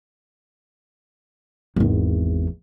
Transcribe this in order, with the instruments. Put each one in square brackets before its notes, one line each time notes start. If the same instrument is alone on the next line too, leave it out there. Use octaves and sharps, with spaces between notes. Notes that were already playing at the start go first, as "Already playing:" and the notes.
[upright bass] G#1 E2